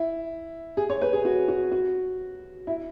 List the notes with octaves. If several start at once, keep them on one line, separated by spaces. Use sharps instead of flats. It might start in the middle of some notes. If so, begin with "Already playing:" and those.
Already playing: E4
G#4
C#5
B4
G#4
F#4
F#4
F#4
E4